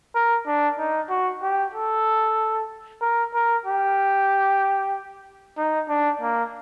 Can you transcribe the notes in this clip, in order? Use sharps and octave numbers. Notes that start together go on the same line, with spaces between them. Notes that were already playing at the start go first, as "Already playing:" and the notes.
A#4
D4
D#4
F#4
G4
A4
A#4
A#4
G4
D#4
D4
A#3